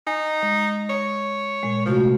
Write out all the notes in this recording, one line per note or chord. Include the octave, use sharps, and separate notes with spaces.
D#4 G#5
G#3
C#5
A#2 G#3
C3 F3 A3 F#4